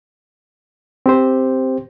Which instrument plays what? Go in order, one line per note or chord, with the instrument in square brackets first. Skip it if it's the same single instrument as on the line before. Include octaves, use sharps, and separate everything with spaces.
[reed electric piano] C4 G4 C5